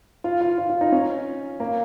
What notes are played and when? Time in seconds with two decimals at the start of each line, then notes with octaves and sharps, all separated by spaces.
0.24 F4
0.41 F4
0.58 F4
0.70 F4
0.81 D#4
0.92 C#4
1.60 A#3